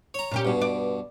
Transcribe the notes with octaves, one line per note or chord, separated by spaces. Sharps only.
C#5 A#5
A#2 C#4 G4
G2 B2
D5